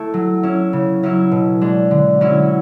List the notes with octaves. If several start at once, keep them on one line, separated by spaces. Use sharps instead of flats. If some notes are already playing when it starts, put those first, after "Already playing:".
Already playing: A3 E4
F#3
C#4 E4
C#3
F#3 C#4 E4
B2
G#3 D4
D3
F#3 C#4 E4